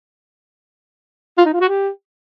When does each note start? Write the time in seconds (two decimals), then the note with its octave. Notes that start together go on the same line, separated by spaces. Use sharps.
1.38 F4
1.45 D#4
1.53 F4
1.61 F#4
1.68 G4